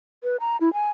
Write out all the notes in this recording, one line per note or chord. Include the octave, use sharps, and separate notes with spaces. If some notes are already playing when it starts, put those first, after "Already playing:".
B4
A#5
E4
G#5